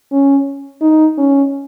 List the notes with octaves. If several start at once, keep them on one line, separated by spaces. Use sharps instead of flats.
C#4
D#4
C#4